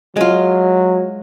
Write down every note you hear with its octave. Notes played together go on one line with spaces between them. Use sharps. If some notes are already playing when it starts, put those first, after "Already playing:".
F#3 G#3 F4